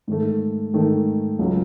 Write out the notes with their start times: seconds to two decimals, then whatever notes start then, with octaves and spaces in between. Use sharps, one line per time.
0.08 G#2 D#3 A3
0.73 G#2 D#3 A3
1.39 C#2 C#3 F#3